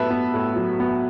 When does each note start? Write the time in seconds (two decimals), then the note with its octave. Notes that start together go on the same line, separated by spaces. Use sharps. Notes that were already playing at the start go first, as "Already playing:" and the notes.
Already playing: A2 F#3 B3 B4 E5 A5
0.10 B3
0.34 A2
0.56 F#3
0.80 B3